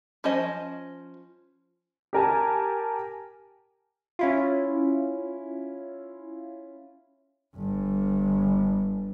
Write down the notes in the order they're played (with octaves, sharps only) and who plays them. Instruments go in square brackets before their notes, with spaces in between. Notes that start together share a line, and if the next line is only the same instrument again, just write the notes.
[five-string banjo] F3 C#4 C5 D#5
[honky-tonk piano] G4 A#4 G#5 A5
[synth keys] C#4 E4 F4
[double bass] G1 G2